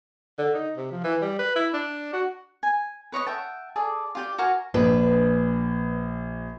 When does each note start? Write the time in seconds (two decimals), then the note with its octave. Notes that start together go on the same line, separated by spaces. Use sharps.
0.38 D3
0.54 D#4
0.77 C3
0.91 F3
1.04 E3
1.22 G3
1.39 B4
1.55 E4
1.73 D4
2.13 F#4
2.63 G#5
3.12 B4 C#5 D#5 C#6
3.27 E5 F#5 G5 A5
3.76 G#4 A4 D5
4.15 F4 G4 D5
4.38 F#4 A#4 F5 G#5
4.74 A#1 D4 B4